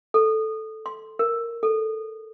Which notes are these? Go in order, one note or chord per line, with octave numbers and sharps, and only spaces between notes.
A4
C6
A#4
A4